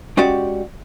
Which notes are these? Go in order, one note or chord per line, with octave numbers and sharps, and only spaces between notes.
G#3 C#4 F#4 G4 D5 F#5